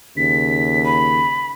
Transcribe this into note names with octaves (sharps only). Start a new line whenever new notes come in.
D#2 C#3 B6
B5